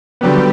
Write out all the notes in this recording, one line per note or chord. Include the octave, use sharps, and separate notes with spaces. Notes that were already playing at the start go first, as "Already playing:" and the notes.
D3 F#3 G3 B3 G4